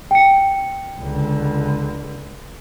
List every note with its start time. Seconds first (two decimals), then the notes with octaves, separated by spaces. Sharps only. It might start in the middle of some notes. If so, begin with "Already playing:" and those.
0.11 G5 C#7
1.00 C#2 D3